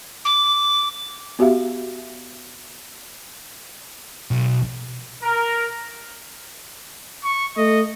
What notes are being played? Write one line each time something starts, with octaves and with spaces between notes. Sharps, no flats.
D6
B3 F#4 G4 E5 F5
B1
A#4
C#6
A3 D#5